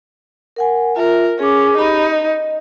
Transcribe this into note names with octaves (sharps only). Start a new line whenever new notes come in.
A#4 F#5 G#5
F4 A#4 E5
C#4 G#4 D6
D#4 G4 B5
D#5